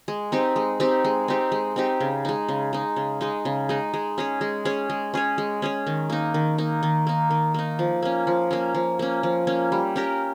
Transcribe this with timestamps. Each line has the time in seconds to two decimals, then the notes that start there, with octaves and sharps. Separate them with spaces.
0.08 G#3
0.32 C4 D#4 G4
0.56 G#3
0.80 C4 D#4 G4
1.04 G#3
1.28 C4 D#4 G4
1.52 G#3
1.76 C4 D#4 G4
2.00 C#3
2.25 G#3 D#4
2.49 C#3
2.73 G#3 D#4
2.96 C#3
3.21 G#3 D#4
3.45 C#3
3.69 G#3 D#4
3.94 G#3
4.18 C#4 G#4 C#5
4.41 G#3
4.65 C#4 G#4 C#5
4.90 G#3
5.14 C#4 G#4 C#5
5.38 G#3
5.62 C#4 G#4 C#5
5.87 D#3
6.10 A#3 D#4
6.34 D#3
6.58 A#3 D#4
6.83 D#3
7.07 A#3 D#4
7.30 D#3
7.54 A#3 D#4
7.79 F3
8.02 A#3 C#4
8.27 F3
8.51 A#3 C#4
8.75 F3
8.99 A#3 C#4
9.23 F3
9.47 A#3 C#4
9.72 G3
9.96 C#4 G4 A#4